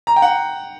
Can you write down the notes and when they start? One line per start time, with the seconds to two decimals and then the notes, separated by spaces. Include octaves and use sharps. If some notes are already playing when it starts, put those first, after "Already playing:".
0.07 A#5
0.16 G5
0.22 F#5